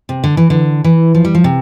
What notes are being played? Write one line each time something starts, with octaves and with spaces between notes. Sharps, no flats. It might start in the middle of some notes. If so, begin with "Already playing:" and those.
C3
D3
E3
D3
E3
F3
G3
F3
C3